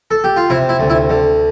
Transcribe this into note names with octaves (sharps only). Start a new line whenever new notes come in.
A4
G4
F4
C3 E4
E4
D2
E4
D3